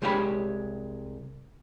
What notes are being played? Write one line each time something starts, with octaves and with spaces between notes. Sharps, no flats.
C2 G#3 G4 C#5 F#5 B5